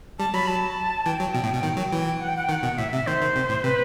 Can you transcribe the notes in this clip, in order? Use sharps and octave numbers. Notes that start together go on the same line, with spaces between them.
G3 A5
F#3 B5
A5
E3 G5
F#3
B2
A2
B2
D#3
F#3
E3
F#5
G5
F#5
G5
D#3
F#5
B2
A2 E5
C3 E5
D#3 C5
D#3
C3
A2
C3 B4